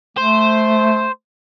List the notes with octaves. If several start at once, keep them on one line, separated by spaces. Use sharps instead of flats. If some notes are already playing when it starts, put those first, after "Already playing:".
A3 C5